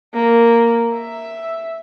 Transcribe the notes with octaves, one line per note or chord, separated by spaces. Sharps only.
A#3
E5